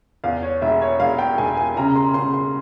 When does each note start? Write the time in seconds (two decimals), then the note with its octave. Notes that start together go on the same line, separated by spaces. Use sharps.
0.24 E2 F5
0.43 C#5
0.62 E1 E5
0.81 C#5
1.00 E1 F5
1.19 G5
1.38 E1 G#5
1.57 G#5
1.77 C#3 A#5
1.96 C6
2.14 C#3 C6
2.34 C6